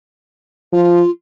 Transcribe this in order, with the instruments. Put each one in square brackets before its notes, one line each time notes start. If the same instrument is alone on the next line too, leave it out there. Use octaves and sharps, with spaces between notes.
[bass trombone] F3 [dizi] F4